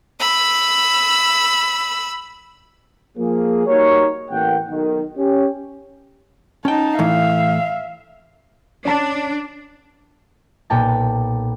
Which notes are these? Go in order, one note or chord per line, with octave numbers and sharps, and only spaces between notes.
B5 E6
F3 A#3 G#4
G3 A#3 D#4 F#4 A#4 C#5
A1 A#3 F#5 G5
B1 D#3
C#4 G4
C#4 D#4 G5 A5
A2 E3 E5 F5
C#4 D4 A5
B1 A#2 G5 A5 A6